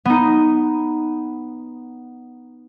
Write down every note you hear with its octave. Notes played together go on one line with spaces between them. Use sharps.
B3 D#4